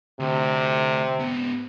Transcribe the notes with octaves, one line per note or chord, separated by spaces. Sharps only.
D2 C3
G#2 B3